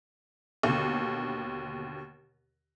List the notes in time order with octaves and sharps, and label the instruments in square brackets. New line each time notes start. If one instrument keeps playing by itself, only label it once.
[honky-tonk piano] D#2 B2 D3